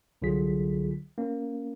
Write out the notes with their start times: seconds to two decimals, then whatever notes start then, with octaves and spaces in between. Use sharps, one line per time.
0.22 C2 D3 F#3 F4 G#4 B6
1.18 A#3 C#4